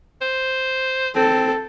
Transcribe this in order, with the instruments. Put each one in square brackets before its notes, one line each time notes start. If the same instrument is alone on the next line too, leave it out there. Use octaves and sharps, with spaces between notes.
[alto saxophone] C5
[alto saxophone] C4 [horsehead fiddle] A4